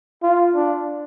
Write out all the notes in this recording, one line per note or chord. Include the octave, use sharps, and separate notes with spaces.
F4
D4